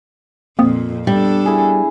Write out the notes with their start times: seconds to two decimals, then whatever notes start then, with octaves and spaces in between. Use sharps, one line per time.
0.59 F2 A#2 A#3 C4 D#6
1.07 G3 B3 D4 A4
1.46 E4 G#4